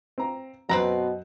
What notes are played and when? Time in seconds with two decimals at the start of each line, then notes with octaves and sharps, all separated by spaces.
0.18 C4 A#5
0.69 F#2 B2 C4 B4 A#5 F#6